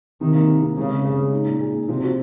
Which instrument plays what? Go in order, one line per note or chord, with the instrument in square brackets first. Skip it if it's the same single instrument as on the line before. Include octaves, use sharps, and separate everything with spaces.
[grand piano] C3 [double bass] D#3
[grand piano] A#3
C3
C3
[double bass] C#3 [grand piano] G#3
[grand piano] C#4
C#4
G#3
D#4
A#2
G#4
A#2
[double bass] C3 [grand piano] F3
[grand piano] F#4